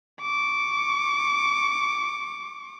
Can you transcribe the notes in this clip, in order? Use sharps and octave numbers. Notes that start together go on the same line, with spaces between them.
C#6 D6